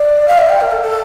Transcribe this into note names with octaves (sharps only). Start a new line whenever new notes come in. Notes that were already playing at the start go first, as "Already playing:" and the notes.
Already playing: D5
F5
E5
G5
A#4
A4
A4